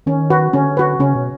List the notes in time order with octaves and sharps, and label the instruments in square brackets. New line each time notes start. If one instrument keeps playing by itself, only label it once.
[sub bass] D#3 [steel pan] C#4
[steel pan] F#4 B4
[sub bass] D3 [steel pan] C#4
[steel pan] F#4 B4
[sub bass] C#3 [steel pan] C#4
[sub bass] B2